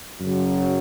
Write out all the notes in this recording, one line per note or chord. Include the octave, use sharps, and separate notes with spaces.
F#2 C#3 F#3